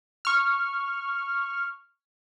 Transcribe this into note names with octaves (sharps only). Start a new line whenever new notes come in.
C#6 F6